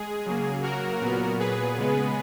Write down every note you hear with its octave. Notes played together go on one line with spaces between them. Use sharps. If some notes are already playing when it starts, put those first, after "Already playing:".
Already playing: G#3 G#4
C#3 F#3 A#3
F#4 A#4
A#2 F#3 B3
G#4 B4
C#3 G#3 B3